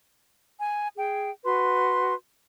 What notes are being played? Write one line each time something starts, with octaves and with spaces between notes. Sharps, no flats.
G#5
G#4 G5
F#4 B4 C6